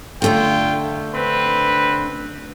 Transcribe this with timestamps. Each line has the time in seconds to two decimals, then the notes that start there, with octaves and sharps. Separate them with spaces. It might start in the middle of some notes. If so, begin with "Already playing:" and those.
0.22 D3 A3 D4 F4 G5
1.13 C4 B4